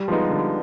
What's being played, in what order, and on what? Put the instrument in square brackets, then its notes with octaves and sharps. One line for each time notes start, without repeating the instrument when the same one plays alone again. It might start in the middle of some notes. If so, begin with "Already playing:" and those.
Already playing: [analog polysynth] G3
[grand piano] F3 G#3 B3 D#4
D3